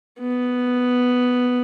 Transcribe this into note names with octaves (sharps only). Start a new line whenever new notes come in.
B3